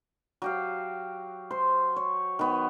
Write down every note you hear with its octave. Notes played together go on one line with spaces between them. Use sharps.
F#3 G4 F5
C5 C6
C#5
D#3 B3